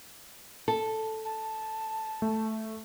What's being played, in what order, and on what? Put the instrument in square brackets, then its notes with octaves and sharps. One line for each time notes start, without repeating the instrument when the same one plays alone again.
[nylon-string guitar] A4
[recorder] A5
[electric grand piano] A3